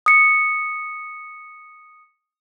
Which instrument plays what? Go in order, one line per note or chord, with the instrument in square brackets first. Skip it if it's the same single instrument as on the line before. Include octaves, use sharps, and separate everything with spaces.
[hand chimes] D#6 C#7